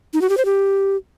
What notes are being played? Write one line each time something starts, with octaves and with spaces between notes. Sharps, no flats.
D#4
F#4
G4
C5
G4